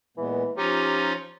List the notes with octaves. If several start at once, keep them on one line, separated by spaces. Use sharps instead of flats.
A#2 E3 G#3 B3
F3 C#4 D#4 F4 G4 C#5 A#5